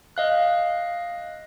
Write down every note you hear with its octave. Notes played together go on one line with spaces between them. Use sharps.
D#5 F5 F#6